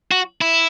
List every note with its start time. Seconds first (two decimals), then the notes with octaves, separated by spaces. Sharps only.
0.11 F#4
0.41 E4